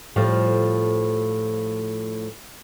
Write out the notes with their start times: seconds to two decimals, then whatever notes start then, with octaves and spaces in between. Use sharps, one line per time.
0.16 A2 F3 G3